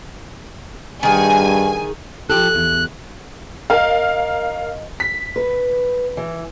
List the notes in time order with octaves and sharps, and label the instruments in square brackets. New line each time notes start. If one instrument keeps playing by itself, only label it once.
[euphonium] G2 [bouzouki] D#3 G#4 [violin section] G#5
[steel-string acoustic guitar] F3 G4 A4 [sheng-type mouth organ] F#6
[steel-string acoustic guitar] E2
[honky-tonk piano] A#4 F5 [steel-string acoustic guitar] D#5
[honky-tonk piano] B6
[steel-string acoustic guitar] B4
E3